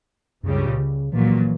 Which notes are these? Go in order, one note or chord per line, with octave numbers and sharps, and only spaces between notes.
C#2 F#2 C#3 G3
G2
A#2
C#3
A#1 A#2 E3 F#3